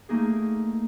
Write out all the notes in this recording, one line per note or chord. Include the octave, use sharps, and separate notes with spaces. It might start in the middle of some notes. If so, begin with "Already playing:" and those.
A3 A#3 D#4 G#4